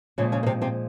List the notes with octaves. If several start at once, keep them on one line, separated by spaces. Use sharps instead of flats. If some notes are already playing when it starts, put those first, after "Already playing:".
A#2 C#3 F3 G#3 C#4
C#3 C#4
A#3
C3 C4
C3 C4